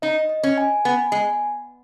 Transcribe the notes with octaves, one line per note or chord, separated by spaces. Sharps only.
D#4 D#5
D#5
C#4
G#5
B3 G#5
G#3 G#5